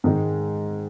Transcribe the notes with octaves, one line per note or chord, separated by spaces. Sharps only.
G#2 D#3 G#3